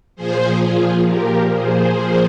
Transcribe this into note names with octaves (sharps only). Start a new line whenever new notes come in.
A#2 F3 G#4 C5
F4 G#4
G4 A#4
G#4 C5
A#2 F3